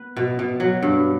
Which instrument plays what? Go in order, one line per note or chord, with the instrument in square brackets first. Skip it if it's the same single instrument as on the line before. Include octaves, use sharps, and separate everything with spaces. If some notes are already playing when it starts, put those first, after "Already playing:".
Already playing: [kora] B3 B4
B2
B2
F#3
G2